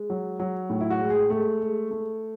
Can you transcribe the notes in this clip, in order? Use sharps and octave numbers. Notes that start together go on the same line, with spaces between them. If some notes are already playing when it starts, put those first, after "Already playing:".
Already playing: G#3
F#3
F#3
A2
E4
F#4
G#3
G#4
G#3 A3
G#3
A3